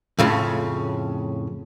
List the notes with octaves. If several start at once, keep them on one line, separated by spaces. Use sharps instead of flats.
F2 A2 C#3